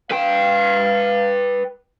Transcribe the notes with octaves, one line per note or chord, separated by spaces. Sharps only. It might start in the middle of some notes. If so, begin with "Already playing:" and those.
B4 F5 G5